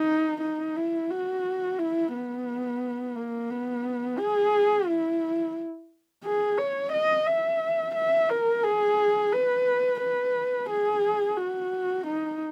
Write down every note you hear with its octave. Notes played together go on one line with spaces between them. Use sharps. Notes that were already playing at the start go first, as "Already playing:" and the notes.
Already playing: D#4
D#4
E4
F#4
E4
B3
A#3
B3
G#4
E4
G#4
C#5
D#5
E5
E5
A#4
G#4
B4
B4
G#4
F#4
D#4